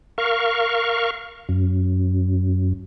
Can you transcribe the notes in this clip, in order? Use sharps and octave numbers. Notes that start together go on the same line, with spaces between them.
A#4 F5 C#6
F#2